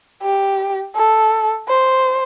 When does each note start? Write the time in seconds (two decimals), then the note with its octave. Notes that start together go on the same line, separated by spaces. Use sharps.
0.22 G4
0.95 A4
1.68 C5